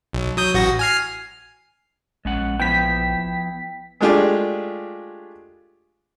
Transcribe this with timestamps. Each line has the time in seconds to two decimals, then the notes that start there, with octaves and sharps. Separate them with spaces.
0.13 B1
0.37 F#3 D#6 G6
0.54 A1 F#4 A#6
0.79 G#5 F6 C7
2.25 A#1 G#3 C#4 F#5
2.60 F3 B3 E4 G5 B6
4.01 G#3 A3 D4 F4 G4 G#4